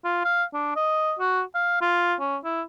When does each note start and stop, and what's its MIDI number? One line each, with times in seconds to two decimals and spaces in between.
0.05 0.22 65
0.25 0.43 77
0.54 0.75 62
0.76 1.14 75
1.19 1.42 66
1.55 1.78 77
1.81 2.14 65
2.20 2.37 61
2.44 2.62 64